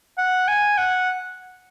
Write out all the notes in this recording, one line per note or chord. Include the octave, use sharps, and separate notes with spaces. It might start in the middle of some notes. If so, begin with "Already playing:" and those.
F#5
G#5
F#5